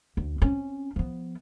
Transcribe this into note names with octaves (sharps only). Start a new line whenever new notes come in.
D2
C4 C#4
F3 B3